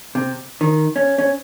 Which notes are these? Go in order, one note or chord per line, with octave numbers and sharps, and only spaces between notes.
C3
D#3
C#4
C#4